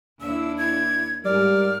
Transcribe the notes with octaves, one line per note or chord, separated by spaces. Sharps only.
D#2 D4 E4 E6
G#6
G#2 G3 A#4 D5 F6